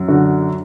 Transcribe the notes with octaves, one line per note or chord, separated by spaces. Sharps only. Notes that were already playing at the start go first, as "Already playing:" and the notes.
Already playing: F#2
D3 F#4